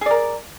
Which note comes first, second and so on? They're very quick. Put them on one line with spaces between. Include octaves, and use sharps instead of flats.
G#4 D5 A#4